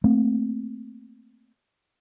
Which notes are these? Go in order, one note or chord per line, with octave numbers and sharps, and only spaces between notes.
A3 A#3 C4